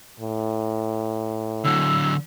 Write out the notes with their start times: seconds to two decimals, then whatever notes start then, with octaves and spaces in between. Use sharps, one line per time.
0.20 A2
1.64 D3 F#3 E6